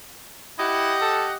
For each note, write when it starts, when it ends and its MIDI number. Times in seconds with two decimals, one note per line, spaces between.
0.59 0.96 64
0.59 1.36 67
0.59 1.36 75
0.59 1.36 78
1.02 1.25 69